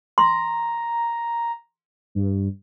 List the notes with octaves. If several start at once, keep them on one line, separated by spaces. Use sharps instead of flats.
A#5 C6
G2